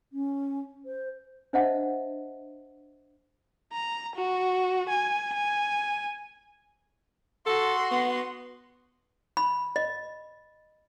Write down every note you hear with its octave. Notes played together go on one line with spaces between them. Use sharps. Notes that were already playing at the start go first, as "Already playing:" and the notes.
C#4
C5
D4 C5 D#5 E5 F#5 A5
A#5
F#4
G#5
G#5
F#4 A4 C6
B3
B5
D#5